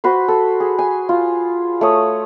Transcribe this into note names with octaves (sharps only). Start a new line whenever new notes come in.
F#4 B4 C5
A4
G#4
G#5
F4
A3 C#5 D#6